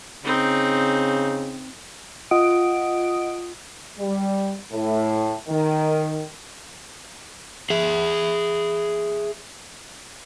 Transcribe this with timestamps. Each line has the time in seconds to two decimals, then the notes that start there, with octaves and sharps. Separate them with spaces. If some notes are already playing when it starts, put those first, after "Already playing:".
0.24 C#3 C4 D#4
2.31 F4 D#5 F#5 D#6 D7
4.00 G3
4.72 A2
5.48 D#3
7.70 G#4 E5